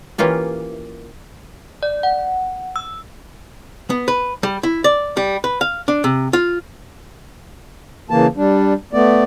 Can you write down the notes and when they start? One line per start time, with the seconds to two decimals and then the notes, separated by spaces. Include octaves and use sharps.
0.18 E3 A#3 C#4 F4 G4
1.83 D5
2.03 F#5
2.76 E6
3.90 B3
4.08 B4
4.43 G3
4.63 E4
4.84 D5
5.17 G3
5.44 B4
5.61 F5
5.88 D4
6.04 C3
6.33 F4
8.10 C#3 E3 A#3 A5
8.37 G3 D4
8.93 A3 B3 D5